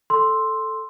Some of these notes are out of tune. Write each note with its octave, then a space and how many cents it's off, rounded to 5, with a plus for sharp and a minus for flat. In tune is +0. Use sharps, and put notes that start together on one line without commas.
A4 +0 C6 +0 E6 +0